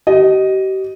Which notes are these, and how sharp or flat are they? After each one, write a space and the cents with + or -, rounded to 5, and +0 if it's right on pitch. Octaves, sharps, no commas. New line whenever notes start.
G4 -40 D#5 +0